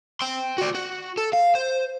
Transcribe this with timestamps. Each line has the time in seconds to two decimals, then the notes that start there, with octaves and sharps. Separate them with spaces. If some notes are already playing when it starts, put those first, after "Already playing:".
0.21 G5 C6
0.58 F#4 D5
0.75 F#4
1.17 A4
1.33 F5
1.55 C5